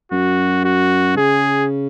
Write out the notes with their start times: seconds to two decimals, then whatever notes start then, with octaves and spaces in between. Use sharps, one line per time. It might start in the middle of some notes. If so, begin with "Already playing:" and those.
0.12 F#2 F#4
0.65 F#4
1.17 C#3 G#4